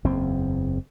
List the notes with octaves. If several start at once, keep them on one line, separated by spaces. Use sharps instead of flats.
F#1 E2 C4